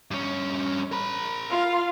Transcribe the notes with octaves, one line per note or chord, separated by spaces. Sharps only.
G2 C#4
A#4 B5
F4 F5